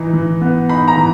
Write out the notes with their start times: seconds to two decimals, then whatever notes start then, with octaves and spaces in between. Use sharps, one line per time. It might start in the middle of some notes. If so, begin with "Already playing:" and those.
Already playing: E3 D#4
0.13 E3
0.41 B3
0.69 D#4 B5
0.88 A#5
0.97 E3